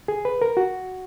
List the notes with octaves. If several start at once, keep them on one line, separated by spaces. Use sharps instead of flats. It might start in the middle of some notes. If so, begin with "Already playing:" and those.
G#4
B4
A#4
F#4